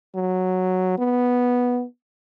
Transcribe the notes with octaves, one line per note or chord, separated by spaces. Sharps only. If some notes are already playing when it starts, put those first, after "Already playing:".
F#3
B3